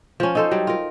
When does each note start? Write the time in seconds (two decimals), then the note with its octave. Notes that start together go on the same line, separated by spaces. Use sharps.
0.20 F3 C#4
0.35 D#4 A4 C5
0.51 F#3 G3
0.67 F4 A#4